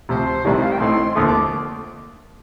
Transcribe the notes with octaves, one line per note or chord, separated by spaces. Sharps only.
D2 C3 F3 C5
C2 C3 D#3 G3 D5
D#5
F5
G5
A1 A2 A3 C4 D#4 C6
F1 D#2 D3 F3 A3 D#6
D6